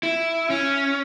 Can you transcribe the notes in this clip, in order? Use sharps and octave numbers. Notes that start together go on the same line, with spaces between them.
E4
C#4